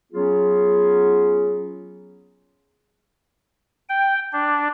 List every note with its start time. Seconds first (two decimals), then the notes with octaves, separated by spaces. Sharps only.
0.12 F#3 B3 C#4 F4 G#4
3.89 G5
4.33 D4